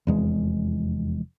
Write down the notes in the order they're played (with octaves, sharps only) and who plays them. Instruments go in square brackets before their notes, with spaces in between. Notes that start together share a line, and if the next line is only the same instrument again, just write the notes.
[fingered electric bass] F1 E2 G#3